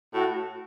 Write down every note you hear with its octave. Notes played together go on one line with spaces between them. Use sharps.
A2 F#4